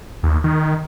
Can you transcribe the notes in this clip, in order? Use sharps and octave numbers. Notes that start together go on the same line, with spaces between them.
D#2
D#3